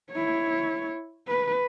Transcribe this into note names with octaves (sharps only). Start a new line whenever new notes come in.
E4 C#5
B4